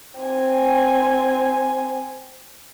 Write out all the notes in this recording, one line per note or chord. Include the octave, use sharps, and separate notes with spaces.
C4 G#5